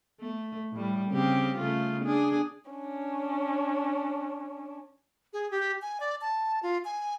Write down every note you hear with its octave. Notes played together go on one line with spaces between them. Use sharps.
A3
A2 G3
C#3 C4 G4
C#3 A3 F4
D4 G#4
C#4 D4
G#4
G4
G#5
D5
A5
F4
G#5